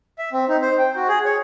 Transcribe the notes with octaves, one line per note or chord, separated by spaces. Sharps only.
E5
C4
D#4
C5
G5
F#4
G#4
C#5